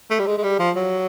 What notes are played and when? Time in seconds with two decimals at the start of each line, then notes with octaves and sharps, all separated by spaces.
0.10 A3
0.20 G3
0.27 G#3
0.38 G#3
0.43 G3
0.59 F3
0.76 F#3